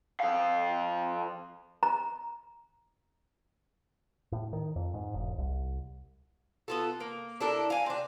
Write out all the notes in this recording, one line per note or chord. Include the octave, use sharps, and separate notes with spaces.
F2 F5
A#5
A2
D#3
F2
G#2
E1
C2
B3 F4 A4
A#3
D4 E4 A4 A#4
F5 G#5
C4 D4